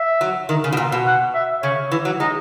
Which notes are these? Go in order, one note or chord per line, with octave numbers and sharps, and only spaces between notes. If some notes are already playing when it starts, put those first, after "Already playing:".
Already playing: E5
F#3
D#3
C#3
B2
A#2
B2
F#5
E5
C#3 C#5
E3
F#3
G#3 D#4